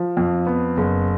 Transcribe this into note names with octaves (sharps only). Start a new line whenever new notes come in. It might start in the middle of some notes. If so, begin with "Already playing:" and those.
Already playing: F3
F2
B3
F#1